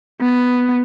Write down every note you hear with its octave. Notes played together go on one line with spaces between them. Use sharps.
B3